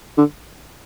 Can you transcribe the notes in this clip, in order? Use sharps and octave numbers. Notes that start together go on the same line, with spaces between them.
D3